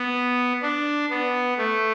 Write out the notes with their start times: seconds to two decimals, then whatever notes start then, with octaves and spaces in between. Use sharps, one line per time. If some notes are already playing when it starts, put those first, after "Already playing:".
Already playing: B3
0.62 D4
1.10 B3
1.58 A3